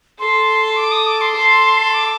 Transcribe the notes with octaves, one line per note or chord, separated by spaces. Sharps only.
A4 C6
D6
D#6
D6
C6
A4
D6